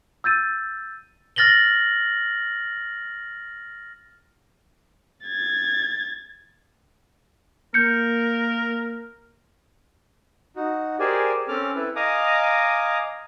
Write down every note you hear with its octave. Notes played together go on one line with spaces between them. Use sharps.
E6 G6 A6 D#7
F6 A6 A#6 F#7 G7
G#6 A6
A#3 A#4 G6 C#7
D#4 F#4
G4 G#4 A#4 C5 D5 G#5
C4 C#4 A4 D6 F6
E4 A4 B4
D#5 F5 G#5 A#5 D6 D#6